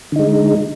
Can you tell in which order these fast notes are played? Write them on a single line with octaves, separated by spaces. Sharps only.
D3 D#4 G#3